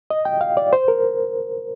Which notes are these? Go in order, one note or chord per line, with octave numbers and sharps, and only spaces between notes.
D#5
G5
F5
D5
C5
A#4